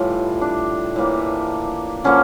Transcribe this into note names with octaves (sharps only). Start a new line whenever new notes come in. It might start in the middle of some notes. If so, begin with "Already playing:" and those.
Already playing: A2 E3 G3 A3 F4
D4
A2 E3 A#3
D3 F3 A#3 C#4